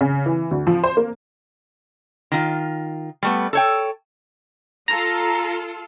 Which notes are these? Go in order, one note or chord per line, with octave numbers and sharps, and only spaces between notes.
C#3
E3
D2
F3
C5
A#3
D#3 F4
G3 A3 B3
A4 C#5 G5
F4 A4 A#5